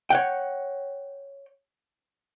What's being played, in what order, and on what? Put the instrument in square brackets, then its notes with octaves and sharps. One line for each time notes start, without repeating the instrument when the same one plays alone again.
[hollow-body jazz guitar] C#5 F#5 G5